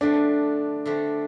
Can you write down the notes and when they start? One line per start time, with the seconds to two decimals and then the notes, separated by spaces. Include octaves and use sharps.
0.01 D3 A3 C4 D4
0.85 D3 A3 C4